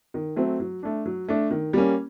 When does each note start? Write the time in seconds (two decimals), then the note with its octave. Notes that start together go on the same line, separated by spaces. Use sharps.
0.14 D#3
0.36 F#3 A3 C4
0.60 F#3
0.83 A3 D4
1.06 F#3
1.28 A3 D4
1.51 D#3
1.73 G3 A#3 C#4